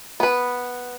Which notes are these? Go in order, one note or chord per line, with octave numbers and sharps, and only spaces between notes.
B3 B4